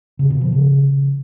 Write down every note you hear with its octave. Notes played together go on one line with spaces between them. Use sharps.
C#3
B2
F3
C#3